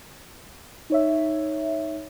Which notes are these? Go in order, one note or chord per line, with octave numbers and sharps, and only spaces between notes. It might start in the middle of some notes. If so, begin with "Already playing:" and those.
D#4 C#5 E5